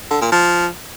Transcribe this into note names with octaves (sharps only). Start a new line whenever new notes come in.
D3
A#2
F3